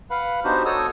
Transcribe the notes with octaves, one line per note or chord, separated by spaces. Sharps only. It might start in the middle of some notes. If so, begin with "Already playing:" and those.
B4 F5 F#5 B5
B3 D4 D#4 F#4 G4 C5
F#4 A4 C#5 D#6 E6